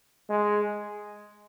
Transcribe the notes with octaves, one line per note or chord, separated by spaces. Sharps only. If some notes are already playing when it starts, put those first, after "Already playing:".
G#3